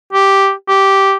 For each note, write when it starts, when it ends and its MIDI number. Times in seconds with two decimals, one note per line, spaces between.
0.13 0.51 67
0.68 1.16 67